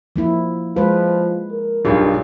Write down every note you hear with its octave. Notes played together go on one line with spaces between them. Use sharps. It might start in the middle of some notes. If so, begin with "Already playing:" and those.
F3 A#3 E4
F3 G#3 B4
A#4
B1 G2 F4 G#4